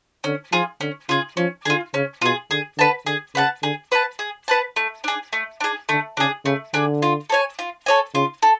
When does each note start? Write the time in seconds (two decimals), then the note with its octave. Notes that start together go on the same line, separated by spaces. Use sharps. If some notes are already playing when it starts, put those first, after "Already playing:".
0.24 D3 C#4
0.52 F3 F4 G#4
0.80 D3 C#4
1.09 C#3 F4 G#4
1.37 F3 C#4
1.65 D3 G#4
1.70 F4
1.94 C#3 C#4
2.22 B2 F4 G#4
2.51 D3 G#4
2.78 D3 B4 F#5 A5
3.06 D3 G#4
3.35 C#3 B4 F#5 A5
3.63 D3 G#4
3.92 B4 F#5 A5
4.19 G#4
4.48 B4 F#5 A5
4.76 A3
5.04 D4 G#4
5.33 A3
5.60 D4 G#4
5.89 D3 A3
6.17 C#3 D4 G#4
6.45 C#3 A3
6.74 D3 D4 G#4
7.02 F4
7.30 A4 C#5 G#5
7.59 F4
7.86 A4 C#5 G#5
8.14 C#3 F4
8.42 A4